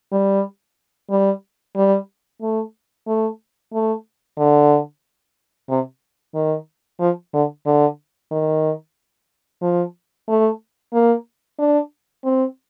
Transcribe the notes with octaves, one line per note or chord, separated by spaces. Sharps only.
G3
G3
G3
A3
A3
A3
D3
C3
D#3
F3
D3
D3
D#3
F3
A3
A#3
D4
C4